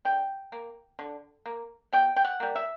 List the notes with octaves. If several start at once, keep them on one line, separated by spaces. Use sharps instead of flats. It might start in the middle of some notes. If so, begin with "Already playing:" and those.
D3 G5
A#3
D3
A#3
B2 G5
G5
F#5
G3 A#3
E5